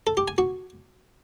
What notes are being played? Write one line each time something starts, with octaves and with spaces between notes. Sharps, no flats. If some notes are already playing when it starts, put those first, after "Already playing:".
A4
G4
G#5
F#4